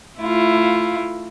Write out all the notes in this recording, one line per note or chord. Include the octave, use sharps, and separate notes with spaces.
A3 E4 F4